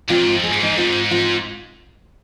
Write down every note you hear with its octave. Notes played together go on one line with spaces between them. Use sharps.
A#2 C4 F4
G#2
F2
G#4
G#2
D#4 G#4
C4 F4
C4 F4